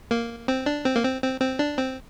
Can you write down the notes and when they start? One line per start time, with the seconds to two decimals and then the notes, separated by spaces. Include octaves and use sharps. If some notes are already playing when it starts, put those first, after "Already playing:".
0.11 A#3
0.48 C4
0.66 D4
0.85 C4
0.96 A#3
1.04 C4
1.23 C4
1.41 C4
1.59 D4
1.78 C4